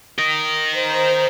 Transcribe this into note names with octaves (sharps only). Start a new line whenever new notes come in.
A#4 D#5
C5 A#5